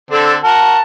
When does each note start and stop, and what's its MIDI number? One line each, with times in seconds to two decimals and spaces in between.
0.11 0.37 50
0.11 0.37 60
0.11 0.37 62
0.11 0.32 69
0.43 0.79 66
0.43 0.79 70
0.43 0.81 81